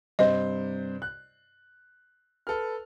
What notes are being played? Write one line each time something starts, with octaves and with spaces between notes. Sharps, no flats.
G2 C3 C5 D#5
F#6
A4 B4 F6